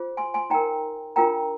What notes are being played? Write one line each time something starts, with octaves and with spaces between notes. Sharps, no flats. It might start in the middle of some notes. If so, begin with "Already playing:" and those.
Already playing: F4 G#4 C5
G#5 C6
G#5 C6
D#4 A#4 G5 A#5
D4 F4 A#4 G5 A#5